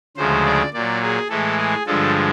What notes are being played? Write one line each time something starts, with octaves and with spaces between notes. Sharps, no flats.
D2 C#3 F3 G#3 C5
D5
A#2 F#3 D5
G#4
A2 E3 G#3 A4
G#4
G2 D3 F3 G#3 A4